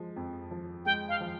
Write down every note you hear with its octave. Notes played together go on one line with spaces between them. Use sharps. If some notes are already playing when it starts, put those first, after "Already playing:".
Already playing: F3 G#3
F2
F3
G#3 G5
F5
F3